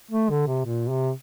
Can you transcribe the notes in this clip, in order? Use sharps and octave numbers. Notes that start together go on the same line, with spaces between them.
A3
D3
C3
A#2
C3